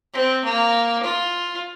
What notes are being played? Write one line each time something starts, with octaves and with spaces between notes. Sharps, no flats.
C4
A#3
F4